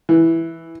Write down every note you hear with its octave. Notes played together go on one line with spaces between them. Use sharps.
E3